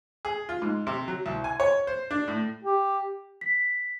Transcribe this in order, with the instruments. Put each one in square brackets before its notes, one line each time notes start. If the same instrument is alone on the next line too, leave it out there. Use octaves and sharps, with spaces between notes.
[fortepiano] G#4
F4
G#2
C3
F#3
C2
G#5
C#5
C5
D4
A2
[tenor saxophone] G4
[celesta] B6